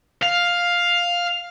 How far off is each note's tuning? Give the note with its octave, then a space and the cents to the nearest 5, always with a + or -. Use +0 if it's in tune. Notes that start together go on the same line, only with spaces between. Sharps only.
F5 +5